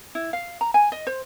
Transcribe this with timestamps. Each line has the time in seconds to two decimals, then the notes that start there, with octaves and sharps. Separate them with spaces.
0.15 E4
0.33 F5
0.61 A#5
0.74 G#5
0.92 D#5
1.07 C5